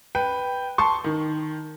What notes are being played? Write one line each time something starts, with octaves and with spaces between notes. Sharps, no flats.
B4 G5
A5 C6 C#6
D#3